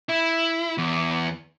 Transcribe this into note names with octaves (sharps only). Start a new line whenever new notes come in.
E4
E2